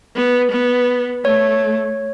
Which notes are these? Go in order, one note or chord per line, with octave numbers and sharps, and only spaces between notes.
B3
B3
A3 C#5